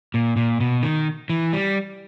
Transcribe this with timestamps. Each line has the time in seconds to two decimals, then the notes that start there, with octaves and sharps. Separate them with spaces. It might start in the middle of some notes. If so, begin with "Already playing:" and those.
0.14 A#2
0.37 A#2
0.60 B2
0.83 D#3
1.30 E3
1.53 G3